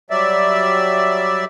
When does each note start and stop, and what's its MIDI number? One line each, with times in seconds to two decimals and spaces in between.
0.10 1.45 54
0.10 1.45 55
0.10 1.45 74
0.10 1.45 76